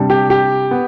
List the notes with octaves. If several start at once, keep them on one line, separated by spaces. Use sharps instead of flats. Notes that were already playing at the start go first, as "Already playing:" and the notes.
Already playing: C3 G3 D4
G4
G4
B3